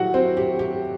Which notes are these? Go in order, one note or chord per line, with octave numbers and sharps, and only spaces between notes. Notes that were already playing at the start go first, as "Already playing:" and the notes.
Already playing: A2 F#3 A3 F#4 G4 F#5
C4 C5
G4
G4